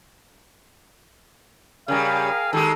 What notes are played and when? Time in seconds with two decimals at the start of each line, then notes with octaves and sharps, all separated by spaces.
1.88 C#3 G3 G#4 A#4 F5 G5
2.53 D#3 G#3 G4 A4